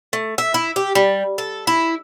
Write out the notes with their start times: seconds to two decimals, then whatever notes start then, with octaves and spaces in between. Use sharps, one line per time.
0.13 A3
0.38 E5
0.54 E4
0.76 G4
0.95 G3
1.38 A4
1.67 E4